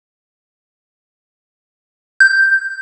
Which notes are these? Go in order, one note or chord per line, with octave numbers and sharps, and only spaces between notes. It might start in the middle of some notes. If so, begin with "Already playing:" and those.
G6